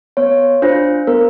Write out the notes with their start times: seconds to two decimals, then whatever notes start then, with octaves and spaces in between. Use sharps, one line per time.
0.17 B3 C#5
0.62 D4 F4 C5
1.07 B3 A#4